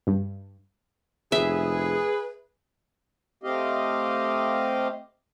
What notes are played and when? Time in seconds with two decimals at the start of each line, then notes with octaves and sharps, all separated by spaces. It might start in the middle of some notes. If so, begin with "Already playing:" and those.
0.07 G2
1.32 F1 G#4 B4 E5
3.44 A3 C4 G4 D#5 F5